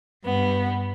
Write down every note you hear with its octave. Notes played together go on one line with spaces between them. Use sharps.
G2 B3